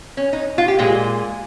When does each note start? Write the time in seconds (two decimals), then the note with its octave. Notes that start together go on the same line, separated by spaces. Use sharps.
0.17 C#4
0.33 D#4
0.58 F4
0.68 G4
0.79 A#2 G#3 G#4